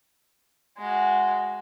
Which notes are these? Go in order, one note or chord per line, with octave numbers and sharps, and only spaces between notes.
G#3 F#4